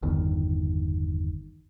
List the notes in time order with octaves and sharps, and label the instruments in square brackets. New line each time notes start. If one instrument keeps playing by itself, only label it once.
[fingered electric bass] G1 E2 D#3